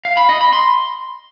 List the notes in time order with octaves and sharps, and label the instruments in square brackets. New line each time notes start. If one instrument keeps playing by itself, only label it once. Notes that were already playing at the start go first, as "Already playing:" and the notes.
[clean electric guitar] F5
B5
D#5
B5
C6